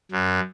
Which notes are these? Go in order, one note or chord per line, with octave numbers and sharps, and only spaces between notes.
F#2